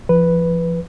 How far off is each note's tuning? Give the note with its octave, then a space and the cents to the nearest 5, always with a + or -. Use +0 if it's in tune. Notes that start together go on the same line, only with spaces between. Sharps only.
F3 -30 B4 +0